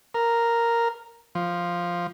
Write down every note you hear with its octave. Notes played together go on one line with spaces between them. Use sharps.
A#4
F3